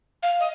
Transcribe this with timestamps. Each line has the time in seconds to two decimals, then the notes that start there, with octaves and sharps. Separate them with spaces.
0.22 F5
0.39 D#5